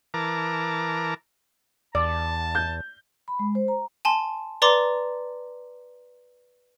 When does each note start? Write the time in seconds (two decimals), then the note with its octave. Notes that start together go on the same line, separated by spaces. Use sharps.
0.14 E3 A#4 A5 A#5 D6
1.95 E2 D5 A5
2.55 G6
3.28 B5
3.39 G#3
3.55 C5
3.68 A#5
4.05 G#5 A5 C6
4.62 B4 D5 A#5 C6 D6